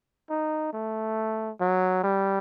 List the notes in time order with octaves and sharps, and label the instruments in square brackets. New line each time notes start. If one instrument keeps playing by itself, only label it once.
[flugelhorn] D#4
A3
F#3
G3